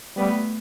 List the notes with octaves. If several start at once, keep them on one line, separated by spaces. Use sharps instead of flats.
G3 A3 B3